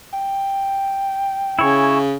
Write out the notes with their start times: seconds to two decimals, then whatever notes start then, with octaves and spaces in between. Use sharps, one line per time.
0.13 G5
1.59 C#3 E4 C#5 G#5